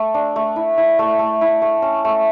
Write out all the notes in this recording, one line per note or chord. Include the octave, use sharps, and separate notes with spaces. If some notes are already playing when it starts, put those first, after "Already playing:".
Already playing: A3
D4
A3
E4
E4
A3
A3
E4
A3
C#4
A3